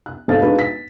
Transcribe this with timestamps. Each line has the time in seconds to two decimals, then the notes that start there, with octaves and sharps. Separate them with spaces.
0.06 F#6
0.28 G#1 A4 C5 F5 A6
0.41 G#3 D4 D#4 F#4 B4 F5
0.59 B6